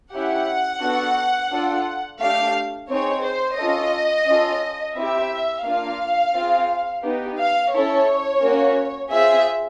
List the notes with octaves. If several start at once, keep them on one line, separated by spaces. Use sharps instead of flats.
C#4 E4 G4 F#5
B3 D4 F#4 A4
D4 F4 A4
A3 D4 G4 F5
C4 D#4 G#4 C#5
C5
C#4 F4 A4 D#5
C#4 F4 A4
C4 E4 G4 E5
A#3 D4 F4 F5
C4 F4 G#4
B3 D#4 G4
F5
C#4 E4 A4 C#5
A#3 C#4 F#4
C4 F4 G#4 E5